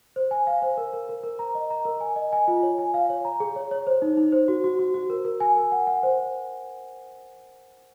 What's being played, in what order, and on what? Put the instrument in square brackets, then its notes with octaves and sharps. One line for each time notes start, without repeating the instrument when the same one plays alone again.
[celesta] C5
G#5
F5
C5
A#4
A#4
A#4
A#4
A#5
D#5
A#5
A#4
G#5
D#5
G#5
F4
C#5
G#5
F5
C#5
A#5
G#4
C#5
C#5
C5
D#4
D#4
C5
F#4
F#4
F#4
F#4
A#4
A#4
G#5
A#4
F#5
F#5
C5